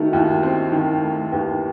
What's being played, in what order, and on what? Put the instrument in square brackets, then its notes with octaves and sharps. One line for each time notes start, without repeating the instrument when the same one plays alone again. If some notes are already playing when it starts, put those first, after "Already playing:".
Already playing: [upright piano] D#3 A3 [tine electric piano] D#4 F#4
[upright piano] D#2 [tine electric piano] E4
[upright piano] C4
D#3
A3
[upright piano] D#2 [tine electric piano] B4